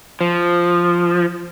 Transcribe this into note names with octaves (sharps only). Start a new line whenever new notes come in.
F3